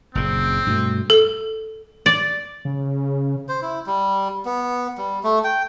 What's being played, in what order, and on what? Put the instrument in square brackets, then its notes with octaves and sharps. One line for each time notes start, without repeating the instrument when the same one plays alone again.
[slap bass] F#1 A#2 C#3 [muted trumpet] C4
[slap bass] G2 B2 A3
[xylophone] A4
[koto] D5
[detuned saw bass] C#3
[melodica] C5
E4
G3
B3
G3
A3
G5